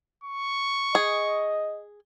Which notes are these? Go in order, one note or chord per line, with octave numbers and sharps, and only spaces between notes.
C#6
G#4 D#5